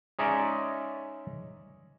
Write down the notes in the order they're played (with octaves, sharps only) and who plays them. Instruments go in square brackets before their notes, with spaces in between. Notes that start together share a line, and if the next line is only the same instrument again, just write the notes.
[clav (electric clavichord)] G#3 C#4 D#4 D5 E5